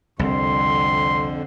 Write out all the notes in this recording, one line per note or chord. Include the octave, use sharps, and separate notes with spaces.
C2 F2 D3 C6